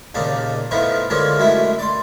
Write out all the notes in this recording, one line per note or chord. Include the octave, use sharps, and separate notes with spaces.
D#2 A#2 C#3 D4 D#4
F2 A2 F3 B3 D#4 E4
D3 E3 F3 G#3 A#3 C#4
F#2 F#3 G#3 A3 E4
D5 C6